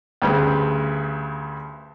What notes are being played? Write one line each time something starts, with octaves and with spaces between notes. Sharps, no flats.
D2 G2 C#3